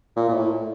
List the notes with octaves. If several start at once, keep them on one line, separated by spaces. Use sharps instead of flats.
A#2
A#2
A2